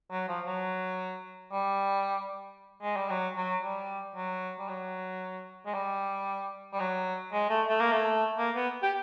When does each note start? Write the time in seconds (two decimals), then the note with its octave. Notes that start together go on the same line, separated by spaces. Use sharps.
0.11 F#3
0.28 F3
0.46 F#3
1.52 G3
2.82 G#3
2.96 G3
3.10 F#3
3.37 F#3
3.63 G3
4.16 F#3
4.59 G3
4.69 F#3
5.66 G#3
5.74 G3
6.73 G3
6.80 F#3
7.33 G#3
7.50 A3
7.68 A3
7.80 A#3
7.92 A3
8.38 A#3
8.55 B3
8.83 G4